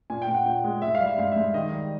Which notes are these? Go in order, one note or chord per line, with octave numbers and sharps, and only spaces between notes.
A#2 G#5
G5
A#2
F#5
A#2 G5
G#3
G#2 E5
F5
G3
E5
G#2 F5
E5
G#2
D#3 D#5
G3